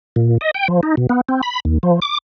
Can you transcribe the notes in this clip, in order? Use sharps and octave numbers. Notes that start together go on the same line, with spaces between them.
A#2
D#5
G5
F3
D#4
B2
B3
C4
B5
D#2
F3
D6